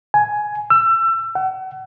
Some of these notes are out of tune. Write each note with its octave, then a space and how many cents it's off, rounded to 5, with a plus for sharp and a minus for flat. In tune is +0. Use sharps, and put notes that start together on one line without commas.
G#5 +10
E6 +30
F#5 +35